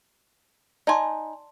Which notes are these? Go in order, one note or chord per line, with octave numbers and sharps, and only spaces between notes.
D#4 D5 G#5 A5 C6